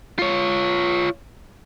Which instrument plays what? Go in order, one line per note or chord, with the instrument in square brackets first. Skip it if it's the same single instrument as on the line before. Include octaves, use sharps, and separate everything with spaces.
[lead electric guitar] F4 C#5